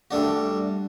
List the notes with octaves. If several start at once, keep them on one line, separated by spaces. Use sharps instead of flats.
G3 A3 D4 F#4